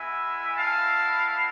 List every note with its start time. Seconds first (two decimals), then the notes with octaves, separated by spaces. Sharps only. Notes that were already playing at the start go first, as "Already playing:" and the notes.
Already playing: G#3 B3 E4 E5 G#5
0.56 F5 A5